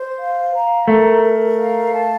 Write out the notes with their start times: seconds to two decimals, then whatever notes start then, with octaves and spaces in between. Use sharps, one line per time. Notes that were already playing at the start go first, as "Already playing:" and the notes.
Already playing: C5
0.18 F5
0.53 A#5
0.88 A3 A#4
1.22 A#4
1.58 F5
1.93 A5